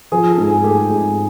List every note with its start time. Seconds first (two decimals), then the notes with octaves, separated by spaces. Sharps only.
0.12 F3 G#4
0.31 A4
0.38 G#2
0.50 G#4
0.64 A3 G4
0.70 G#4
0.91 G#2